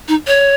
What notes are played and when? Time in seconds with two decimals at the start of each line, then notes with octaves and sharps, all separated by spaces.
0.08 D#4
0.27 C#5